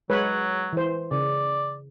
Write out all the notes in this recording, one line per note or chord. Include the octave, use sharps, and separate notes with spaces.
F#3 G#3 B4 C#5
E3 C5
C#3 D5